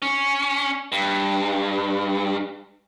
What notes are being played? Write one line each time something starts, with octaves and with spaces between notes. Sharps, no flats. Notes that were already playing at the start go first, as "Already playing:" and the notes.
C#4
G2